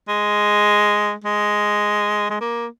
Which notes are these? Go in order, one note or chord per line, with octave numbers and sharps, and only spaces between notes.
G#3
G#3
G#3
A#3